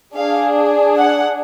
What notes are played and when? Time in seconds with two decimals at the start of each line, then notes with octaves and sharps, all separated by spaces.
0.15 D4 G#4 F5
0.98 F#5